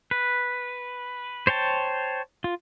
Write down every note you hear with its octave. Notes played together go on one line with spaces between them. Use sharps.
B4
C5 C#5 G5 A5
F4